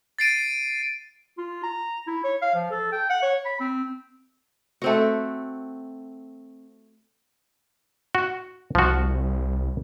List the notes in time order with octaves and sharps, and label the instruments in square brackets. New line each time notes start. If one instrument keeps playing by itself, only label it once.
[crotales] A6 C7 D7 D#7
[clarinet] F4
A#5
E4
C#5
F5
F3
A4
G5
F#5
C#5
B5
C4
[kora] A3 C4 F#4
[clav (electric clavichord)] F#4
[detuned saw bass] C2 [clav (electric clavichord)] F3 F#4